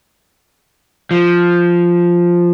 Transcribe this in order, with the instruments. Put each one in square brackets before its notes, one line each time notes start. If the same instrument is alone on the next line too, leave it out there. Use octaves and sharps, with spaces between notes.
[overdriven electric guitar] F3